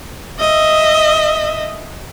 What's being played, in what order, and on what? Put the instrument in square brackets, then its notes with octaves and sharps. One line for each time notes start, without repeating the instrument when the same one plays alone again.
[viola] D#5 E5